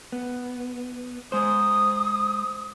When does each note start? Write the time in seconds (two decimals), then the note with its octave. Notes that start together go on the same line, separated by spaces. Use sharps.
0.12 B3
1.32 G#3 C5 D#6